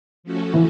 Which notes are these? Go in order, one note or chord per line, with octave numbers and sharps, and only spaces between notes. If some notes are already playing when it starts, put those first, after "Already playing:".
F3 A3 C#4 F#4 A4
E3